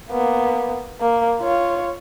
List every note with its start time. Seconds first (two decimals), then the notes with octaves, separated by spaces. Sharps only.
0.11 A#3 B3
1.00 A#3
1.41 F4 C#5